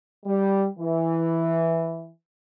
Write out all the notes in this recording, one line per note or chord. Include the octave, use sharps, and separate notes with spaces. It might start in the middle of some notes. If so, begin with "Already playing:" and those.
G3
E3